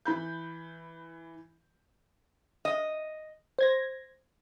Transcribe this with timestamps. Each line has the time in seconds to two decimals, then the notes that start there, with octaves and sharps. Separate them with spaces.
0.05 E3 B5 G6
2.65 D#5
3.59 C5 G#6 A#6